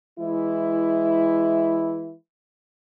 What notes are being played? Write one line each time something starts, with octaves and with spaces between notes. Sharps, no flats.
E3 G#3 E4